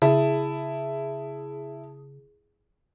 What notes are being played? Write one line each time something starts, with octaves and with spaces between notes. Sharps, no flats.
C#3 E4 G#4 A5